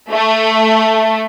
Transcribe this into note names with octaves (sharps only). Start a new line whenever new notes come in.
A3